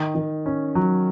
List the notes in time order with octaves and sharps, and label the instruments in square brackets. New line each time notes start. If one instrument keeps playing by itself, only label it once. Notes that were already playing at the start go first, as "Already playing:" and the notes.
Already playing: [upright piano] D#3
D#3
C#4
F#3